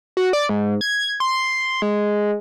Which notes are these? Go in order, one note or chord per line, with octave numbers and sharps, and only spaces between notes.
F#4
D5
G#2
G#6
C6
G#3